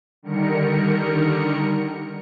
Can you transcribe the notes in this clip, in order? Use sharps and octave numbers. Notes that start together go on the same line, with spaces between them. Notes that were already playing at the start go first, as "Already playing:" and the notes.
D3 D#3 G3 A#4 C#7